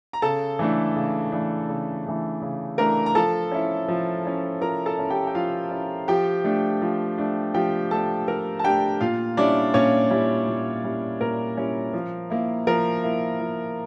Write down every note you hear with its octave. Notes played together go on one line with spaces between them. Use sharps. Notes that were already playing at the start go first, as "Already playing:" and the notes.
A#5
C#3 A4 A5
E3 A3 D4
C#3
E3 A3 D4
C#3
E3 A3 D4
C#3
E3 A3 D4 A#4 A#5
A#5
F3 A4 A5
C#4 E4
F3
C#4 E4
F3 A#4 A#5
A4 A5
C#4 E4
G4 G5
G5
F3 F4 F5
C#4 E4
F3 G4 G5
A3 D4
F3
A3 D4
F3 G4 G5
A3 D4 A4 A5
F3 A#4 A#5
A5
A3 D4 G4 G5
A#2 F4 F5
G3 C#4 D4 E4 D5
A#2 C#4 C#5
G3 C#4 E4
A#2
G3 C#4 E4
A#2 A#4
G3 C#4 E4
F3
A#3 E4
F3 A#4
A#3 E4
F3